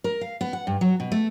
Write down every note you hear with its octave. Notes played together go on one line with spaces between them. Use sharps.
A#4
F5
B3
F#5
G2
F#3
B2
A3